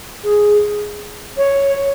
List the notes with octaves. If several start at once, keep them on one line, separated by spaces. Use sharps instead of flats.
G#4
C#5